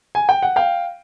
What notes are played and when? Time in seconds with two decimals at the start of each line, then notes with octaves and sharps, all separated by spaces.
0.15 G#5
0.29 G5
0.43 F#5
0.56 F5 G5